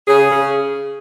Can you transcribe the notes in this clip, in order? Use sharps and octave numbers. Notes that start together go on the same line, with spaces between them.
C#3 G#4
C#3